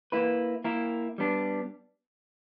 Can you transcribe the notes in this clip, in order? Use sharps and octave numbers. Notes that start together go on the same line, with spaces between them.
A#3 E4 B4
A#3 E4 A#4
G3 B3 D4